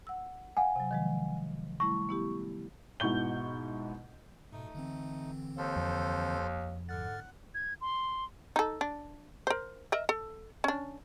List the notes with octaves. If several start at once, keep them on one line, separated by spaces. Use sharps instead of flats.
F#5 E6
F5 F#5 G#5
C3 F#3
D#3 F3 G#3
G3 A3 E4 C#6
B3 E4 G4
G#2 B2 E4 C#6 G6 G7
G#2 B2 A3 D#4
D3 E3 C4
D#2 A4 C5
F2
G#2 D3 F#5 F6 A6
G#6
C6
D#4 A4
D4
A#4 C5
A#4 D#5 E5
A4
C#4 D4